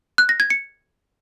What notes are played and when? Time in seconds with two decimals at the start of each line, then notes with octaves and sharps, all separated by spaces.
0.18 F#6
0.29 A#6
0.40 G#6
0.50 C#7